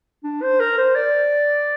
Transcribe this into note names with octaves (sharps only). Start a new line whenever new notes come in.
D4
C5
A#4
C5
D5